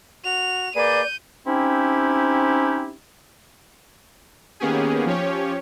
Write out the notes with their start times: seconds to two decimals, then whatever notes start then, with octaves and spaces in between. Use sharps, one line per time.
0.25 F#4 F7
0.76 A#3 G#4 B4 D5 G6 D#7
1.47 C4 C#4 D#4 E4 G4
4.60 D#3 A#3 B3 C#4 G4 G#4
5.06 F3 C#4 G4 C#5